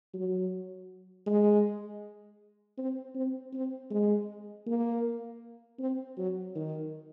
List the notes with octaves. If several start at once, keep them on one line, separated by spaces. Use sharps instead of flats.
F#3
G#3
C4
C4
C4
G#3
A#3
C4
F#3
D#3